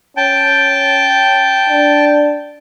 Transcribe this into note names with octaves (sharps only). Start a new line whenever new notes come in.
C#4 G5 A5
D4